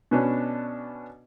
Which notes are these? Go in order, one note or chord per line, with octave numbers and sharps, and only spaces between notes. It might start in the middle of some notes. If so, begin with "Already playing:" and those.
B2 B3 C#4 D4